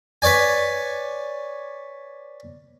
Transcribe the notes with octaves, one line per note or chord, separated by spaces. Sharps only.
B4 C#5 D5 G#5